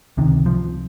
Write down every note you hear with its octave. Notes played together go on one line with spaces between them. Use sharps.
C#2 C3 D#3
F3